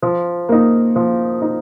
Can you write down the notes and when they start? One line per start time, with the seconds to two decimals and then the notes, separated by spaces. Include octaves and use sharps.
0.02 F3
0.49 A#3 D#4
0.96 F3
1.42 D#4